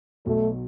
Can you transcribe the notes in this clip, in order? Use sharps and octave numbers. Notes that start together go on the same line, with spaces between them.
B1 B2 F#3 A3